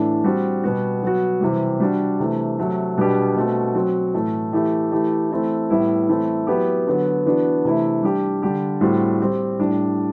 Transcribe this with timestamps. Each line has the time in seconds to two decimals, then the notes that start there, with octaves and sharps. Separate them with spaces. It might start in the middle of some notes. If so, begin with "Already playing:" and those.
Already playing: A2 E3 A3 D4
0.24 G3 C4 F#4
0.64 B2 G3 B3 F#4
1.03 F#3 B3 F#4
1.41 C3 E3 G3
1.80 G3 D4 F#4
2.20 C3 E3 A3
2.59 C3 F#3 A3
2.98 B2 G3 B3 D4 G4
3.35 B2 A3 C4 F#4
3.74 F#3 C4 F#4
4.14 A2 E3 A3
4.53 E3 A3 E4 G4
4.92 E3 A3 E4 G4
5.31 E3 A3 C4 E4
5.70 A2 G3 B3 E4
6.09 E3 A3 C4 E4
6.47 F#3 B3 E4 G4
6.87 D3 F#3 B3 F#4
7.26 E3 B3 D4 F#4
7.65 C3 E3 A3 E4
8.03 G3 D4 G4
8.42 D3 G3 D4 G4
8.81 A2 G3 C4 F#4
9.20 G3 C4 G4
9.59 A2 G3 D4